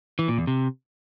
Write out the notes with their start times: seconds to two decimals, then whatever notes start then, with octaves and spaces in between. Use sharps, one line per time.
0.19 E3
0.28 A#2
0.38 E2
0.47 C3